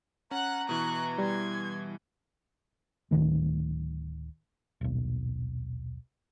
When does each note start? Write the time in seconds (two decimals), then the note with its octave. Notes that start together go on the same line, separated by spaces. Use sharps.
0.31 C#4 F#5 A#5 F#6
0.69 B2 E3 C#6 F#6
1.18 G3 C6 G#6
3.11 D1 E2 D#3 A3
4.81 D#1 B1